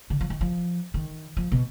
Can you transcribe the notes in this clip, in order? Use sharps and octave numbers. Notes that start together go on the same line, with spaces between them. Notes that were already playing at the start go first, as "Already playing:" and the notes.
D3
F3
D#3
F3
D#3
F3
B2